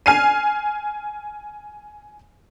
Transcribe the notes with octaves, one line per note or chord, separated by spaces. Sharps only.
G#5 F6 C7 D#7